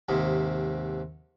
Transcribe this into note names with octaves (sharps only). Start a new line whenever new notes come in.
D#2 G#2 C3